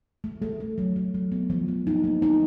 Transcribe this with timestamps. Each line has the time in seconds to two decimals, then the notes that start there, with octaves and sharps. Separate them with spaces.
0.24 A3
0.42 A3
0.60 A3
0.78 F#3
0.96 F#3
1.14 F#3
1.32 B3
1.50 F3
1.68 B3
1.87 D#4
2.04 A#3
2.22 D#4